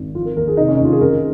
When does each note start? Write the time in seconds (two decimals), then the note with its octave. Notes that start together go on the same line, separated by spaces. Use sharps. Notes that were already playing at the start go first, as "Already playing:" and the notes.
Already playing: G#1
0.15 F3 F4
0.25 A#4
0.36 D#2 A#4
0.48 G#4
0.57 F1 D#4
0.68 C#4
0.76 D#2 D#4
0.85 F4
0.92 G#4
1.01 C#3 A#4